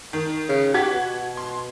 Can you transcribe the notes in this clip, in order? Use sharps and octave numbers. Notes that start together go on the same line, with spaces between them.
D#3
C#3
F#4 G4 G#6 B6
B2
C6